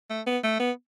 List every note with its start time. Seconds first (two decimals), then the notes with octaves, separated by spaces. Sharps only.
0.10 A3
0.26 B3
0.43 A3
0.60 B3